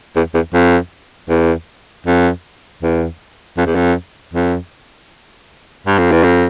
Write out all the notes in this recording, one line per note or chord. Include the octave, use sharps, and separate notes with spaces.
E2
E2
F2
E2
F2
E2
F2
E2
F2
F2
G2
F2
E2
F2